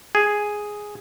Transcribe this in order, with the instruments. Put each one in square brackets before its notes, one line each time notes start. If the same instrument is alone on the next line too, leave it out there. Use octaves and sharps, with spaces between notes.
[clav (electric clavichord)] G#4